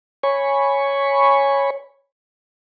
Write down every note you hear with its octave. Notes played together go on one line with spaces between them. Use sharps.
C#5 G#5 B5 C#6